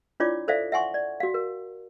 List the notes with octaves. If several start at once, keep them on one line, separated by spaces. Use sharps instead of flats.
D4 E4 F4 C#5 D5 D6
A4 C5 D5 E5 F5
E5 F#5 G#5 C6 C#6
D5
F#4 F5
A#4